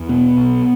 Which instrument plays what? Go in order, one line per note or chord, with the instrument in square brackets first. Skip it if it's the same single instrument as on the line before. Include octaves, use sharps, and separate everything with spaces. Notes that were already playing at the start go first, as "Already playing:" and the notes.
Already playing: [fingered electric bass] E2
B2 B3
B1